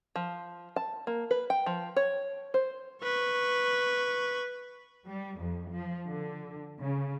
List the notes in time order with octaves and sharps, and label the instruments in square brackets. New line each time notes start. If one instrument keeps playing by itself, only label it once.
[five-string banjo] F3
A5
A#3
B4
G5
F3
C#5
C5
[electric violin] B4 C#6
[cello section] G3
F2
F3
D3
C#3